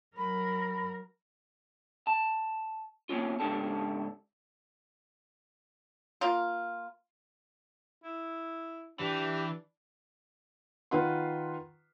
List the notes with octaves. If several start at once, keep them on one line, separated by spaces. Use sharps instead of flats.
F#3 A#4 B5
A5
A#3 C4 C#4 F4
C#2 G#2 D4 G4 A4 A5
A#3 F4
E4
E3 D4 G4
D#3 F4 B4 F#5 C6